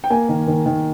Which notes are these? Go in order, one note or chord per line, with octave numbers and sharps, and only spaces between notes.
G5
A#3 G#5
D#3
D#3
D#3